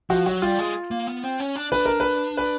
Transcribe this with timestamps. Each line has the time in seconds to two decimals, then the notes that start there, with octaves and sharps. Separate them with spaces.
0.10 F3 F#4
0.26 F#3 F#4
0.42 G3 F4
0.59 G#3
0.91 A#3
1.07 B3
1.24 C4
1.40 C#4
1.56 D4
1.72 D4 B4
1.85 A#4
2.00 B4
2.37 B4